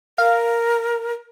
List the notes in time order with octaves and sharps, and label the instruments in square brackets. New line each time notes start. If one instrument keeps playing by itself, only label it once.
[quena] A#4 [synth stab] F5